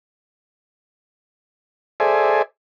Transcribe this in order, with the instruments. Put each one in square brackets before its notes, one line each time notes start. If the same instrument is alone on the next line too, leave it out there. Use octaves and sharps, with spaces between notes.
[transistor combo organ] G#4 A4 C5 D5 E5 G#5